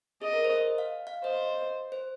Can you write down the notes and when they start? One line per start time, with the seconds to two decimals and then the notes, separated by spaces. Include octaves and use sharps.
0.22 G#4 D#5
0.33 A#4
0.44 C5
0.56 D#5
0.78 F5
1.07 F5
1.24 C5 D#5
1.92 C5